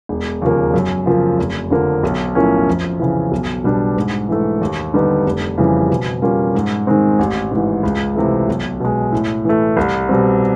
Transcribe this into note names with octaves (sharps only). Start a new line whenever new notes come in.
E1
D#2 C#3 F3 A#3
F#2
C#3 F3 A#3
F1
F2 D3 F3 A#3
B1
A2 F3 A#3 C#4
F2
C#3 E3
B1
B2 G3 B3 D4
G#2
E3 A3
D#2
D3 G3 B3 D#4
F1
F2 C#3 E3 G3
B2
G3 A#3 C#4 F4
G#2
D#3 G#3 C4
A1
G#2 E3
C#2
C3 E3 A3
B1
B2 G#3
A2
E3 A3
C2
B2 G3 C4